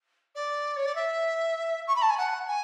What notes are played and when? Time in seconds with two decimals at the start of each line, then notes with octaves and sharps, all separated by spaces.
0.35 D5
0.76 C#5
0.85 D5
0.95 E5
1.87 C#6
1.96 B5
2.02 A5
2.10 G#5
2.18 F#5
2.48 G#5